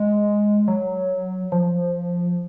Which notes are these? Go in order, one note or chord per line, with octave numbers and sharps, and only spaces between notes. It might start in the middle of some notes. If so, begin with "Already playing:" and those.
Already playing: G#3
F#3
F3